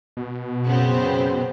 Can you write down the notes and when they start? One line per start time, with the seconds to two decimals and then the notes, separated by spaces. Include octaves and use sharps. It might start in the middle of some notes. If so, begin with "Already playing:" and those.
0.17 B2
0.65 F#2 C#3 B3 C4 C5